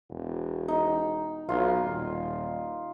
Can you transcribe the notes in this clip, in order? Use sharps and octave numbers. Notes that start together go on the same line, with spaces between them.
E1
D#4
B1 F4
D#1